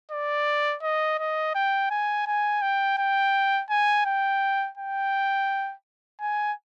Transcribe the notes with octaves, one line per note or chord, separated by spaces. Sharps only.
D5
D#5
D#5
G5
G#5
G#5
G5
G5
G#5
G5
G5
G#5